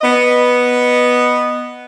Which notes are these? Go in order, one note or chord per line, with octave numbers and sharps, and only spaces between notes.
B3 D#5